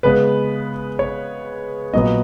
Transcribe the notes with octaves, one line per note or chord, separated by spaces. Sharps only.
C#3 G#3 B3 B4
C#5
A#2 F#3 B3 D#5